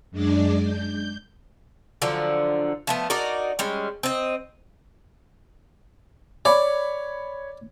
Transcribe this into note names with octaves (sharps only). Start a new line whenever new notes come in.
F#2 G#3 D4 D5
G6
D3 F3 F#3
F3 A3 B3
D#4 F#4 A#4 D5
G3 G#3 C#4
C4 D#5
C#5 D5 B5